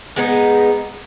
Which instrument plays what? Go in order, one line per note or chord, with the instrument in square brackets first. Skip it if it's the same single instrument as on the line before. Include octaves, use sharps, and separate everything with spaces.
[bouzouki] G#3 B3 D#4